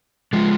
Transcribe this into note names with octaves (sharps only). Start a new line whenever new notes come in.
F3 G#3